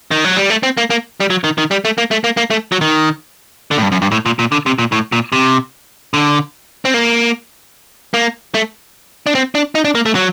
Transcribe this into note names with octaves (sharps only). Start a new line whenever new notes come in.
D#3
F#3
G3
A3
C4
A#3
A#3
G3
F#3
D#3
D#3
G3
A3
A#3
A3
A#3
A#3
A3
F#3
D#3
D3
A2
G2
F#2
G2
A2
A#2
A#2
D3
C3
A#2
A2
A#2
C3
D3
C4
A#3
A#3
A3
D4
C4
D4
D#4
D4
A#3
A3
F#3